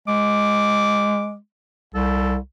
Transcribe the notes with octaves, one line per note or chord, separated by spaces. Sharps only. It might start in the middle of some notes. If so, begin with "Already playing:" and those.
G#3 D6
C2 A4